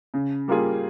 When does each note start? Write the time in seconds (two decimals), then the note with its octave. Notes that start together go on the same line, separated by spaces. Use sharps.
0.14 C#3
0.48 G3 A#3 F4 G#4